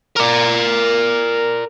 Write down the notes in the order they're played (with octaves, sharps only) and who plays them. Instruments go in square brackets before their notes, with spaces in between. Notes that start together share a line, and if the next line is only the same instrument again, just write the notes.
[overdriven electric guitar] A#4 D5